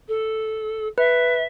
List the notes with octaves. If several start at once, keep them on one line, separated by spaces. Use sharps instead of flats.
A4
B4 E5